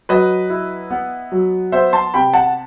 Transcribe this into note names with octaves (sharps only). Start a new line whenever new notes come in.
F#3 B4 D#5
E4
B3
F#3
B3 C5 E5
A5 C6
C3 G5 B5
F#5 A5